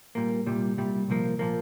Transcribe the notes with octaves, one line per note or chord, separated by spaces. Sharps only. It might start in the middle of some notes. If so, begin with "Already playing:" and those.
A#2 G3 A#3
C2 A#2 G3
C2 A#2 G3
C2 A#2 F3 A#3
A#2 F3 A#3